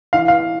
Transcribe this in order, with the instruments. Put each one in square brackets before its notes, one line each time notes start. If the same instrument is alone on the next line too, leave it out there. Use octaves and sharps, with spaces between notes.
[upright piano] E3 F5
F5